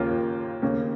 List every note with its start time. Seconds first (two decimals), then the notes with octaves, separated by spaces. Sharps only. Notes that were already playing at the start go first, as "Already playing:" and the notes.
Already playing: D#2 C#3 A#3 C#4 F4
0.62 D#2 C#3 A#3